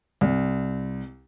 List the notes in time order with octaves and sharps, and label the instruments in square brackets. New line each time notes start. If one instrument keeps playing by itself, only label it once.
[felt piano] C2